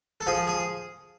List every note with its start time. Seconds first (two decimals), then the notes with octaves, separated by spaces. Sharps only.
0.21 A4
0.27 F3 G#4
0.47 G#4